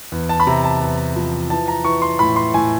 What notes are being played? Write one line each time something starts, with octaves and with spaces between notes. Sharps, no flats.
E2
A5
B5
C3 A#5
A5
E2
F3
E3 A5
A#5
E3 C#6
C6
A2 B5
C6
A2 G#5